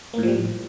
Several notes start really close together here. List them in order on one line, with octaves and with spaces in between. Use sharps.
A#3 A2 F3 G3